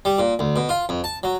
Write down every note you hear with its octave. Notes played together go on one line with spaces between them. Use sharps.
G3
A#2
D2
B2
F4
F2
A5
F#3